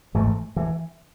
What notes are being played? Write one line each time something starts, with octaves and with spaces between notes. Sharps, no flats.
G#1 G#2 E3 A3
E3